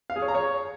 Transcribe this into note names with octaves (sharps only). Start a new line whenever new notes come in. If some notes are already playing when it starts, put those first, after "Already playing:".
F5
G#4
C#5
A#5
C#5